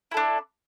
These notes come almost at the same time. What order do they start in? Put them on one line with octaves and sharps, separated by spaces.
E4 A4 D4